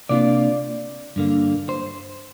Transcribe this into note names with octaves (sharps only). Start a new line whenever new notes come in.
C3 A#3 D4 F4 D5
G2 D3 A#3
C5